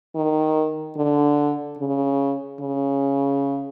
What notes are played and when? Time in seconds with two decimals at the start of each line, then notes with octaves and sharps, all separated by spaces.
0.15 D#3
0.96 D3
1.78 C#3
2.61 C#3